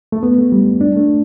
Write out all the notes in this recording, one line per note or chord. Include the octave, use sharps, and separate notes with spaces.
A3
B3
A3
G3
D4
A3